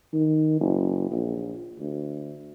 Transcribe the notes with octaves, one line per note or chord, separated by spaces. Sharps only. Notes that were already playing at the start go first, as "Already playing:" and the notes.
D#3
F#1
A#1
D2